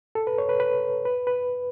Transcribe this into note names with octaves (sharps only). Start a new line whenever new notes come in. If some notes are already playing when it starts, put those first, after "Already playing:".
A4
B4
C#5
B4
B4
B4
B4